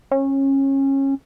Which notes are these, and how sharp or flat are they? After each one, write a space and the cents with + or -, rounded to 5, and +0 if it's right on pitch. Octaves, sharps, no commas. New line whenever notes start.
C#4 -25